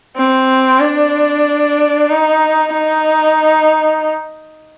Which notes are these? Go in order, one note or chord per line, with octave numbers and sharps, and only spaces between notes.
C4
D4
D#4
D#4